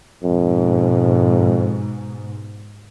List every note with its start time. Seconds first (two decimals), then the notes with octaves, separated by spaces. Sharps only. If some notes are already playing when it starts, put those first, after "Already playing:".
0.24 F2 G#2 B2